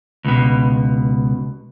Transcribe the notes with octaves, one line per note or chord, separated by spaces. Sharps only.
C#2 B2